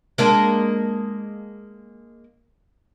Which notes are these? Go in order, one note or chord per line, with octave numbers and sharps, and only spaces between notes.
G#3 A#3 D4